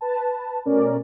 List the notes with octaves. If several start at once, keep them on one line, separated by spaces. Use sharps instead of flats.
B4 A5
B2 A3 C#4 A#4 D5